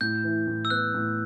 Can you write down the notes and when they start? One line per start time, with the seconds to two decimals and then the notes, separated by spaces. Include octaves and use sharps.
0.01 A2 G6
0.24 E3
0.47 A2
0.65 E6
0.70 B3 F#6
0.94 A2